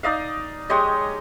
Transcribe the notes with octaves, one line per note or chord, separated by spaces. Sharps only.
D#4 D5 D#5 F5
G#3 G4 C#5 D#5